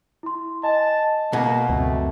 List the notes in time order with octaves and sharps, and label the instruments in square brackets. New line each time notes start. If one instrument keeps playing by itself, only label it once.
[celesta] E4 C6
[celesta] D#5 G#5 [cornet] A5
[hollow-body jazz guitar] B2 [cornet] A#3
[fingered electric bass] C#2 F#2 C4 [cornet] A3